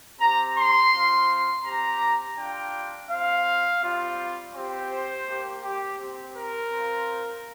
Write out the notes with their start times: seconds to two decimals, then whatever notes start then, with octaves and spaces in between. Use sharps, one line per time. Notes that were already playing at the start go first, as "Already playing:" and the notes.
0.19 C4 G4 A#5
0.56 C6
0.92 C4 F4
1.64 C4 G4 A#5
2.36 G3 D4 F4 G5
3.09 C4 F4 F5
3.81 G3 C4 F4
4.54 C4 G4
4.90 C5
5.26 A#3 G4
5.62 G4
5.98 C4 G4
6.34 A#4
6.71 C4 F4